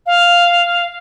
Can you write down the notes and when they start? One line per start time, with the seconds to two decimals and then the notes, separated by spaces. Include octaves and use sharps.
0.06 F5